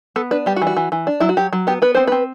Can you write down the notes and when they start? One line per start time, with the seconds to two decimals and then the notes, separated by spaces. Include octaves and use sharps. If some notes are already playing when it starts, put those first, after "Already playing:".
0.16 B3 A4
0.31 D4 B4
0.46 G3 G4
0.56 F#4
0.62 E3
0.67 F#4
0.77 E3
0.92 E3
1.07 D4
1.20 F#3 E4
1.29 F#4
1.37 F#3 G4
1.53 F#3
1.67 B3 G4
1.82 B3 B4
1.95 C4 C5
2.07 C4 B4